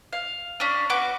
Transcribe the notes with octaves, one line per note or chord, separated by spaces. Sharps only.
F5
C#4 D4
B3 F#4 D6